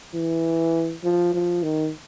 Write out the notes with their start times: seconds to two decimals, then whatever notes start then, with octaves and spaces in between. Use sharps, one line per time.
0.14 E3
1.04 F3
1.34 F3
1.63 D#3